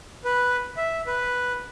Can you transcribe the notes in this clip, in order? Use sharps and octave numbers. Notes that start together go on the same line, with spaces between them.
B4
E5
B4